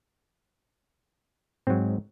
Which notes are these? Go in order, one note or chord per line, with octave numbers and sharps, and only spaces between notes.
G#2 F#3 C4